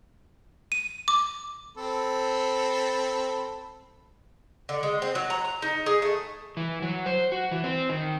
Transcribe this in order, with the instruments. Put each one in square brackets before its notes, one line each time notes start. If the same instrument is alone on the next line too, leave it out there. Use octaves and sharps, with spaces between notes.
[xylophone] D#7
D6
[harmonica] C4 A4 B5
[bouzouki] D3
G#3
C4
F#3
A#5
A#5
D#4
G#4
A3
[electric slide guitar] E3
F#3
C5
F#4
E3
C4
D#3